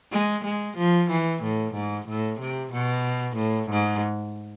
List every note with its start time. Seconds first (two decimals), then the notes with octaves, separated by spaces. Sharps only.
0.12 G#3
0.44 G#3
0.77 F3
1.11 E3
1.43 A2
1.74 G#2
2.08 A2
2.40 C3
2.73 B2
3.37 A2
3.70 G#2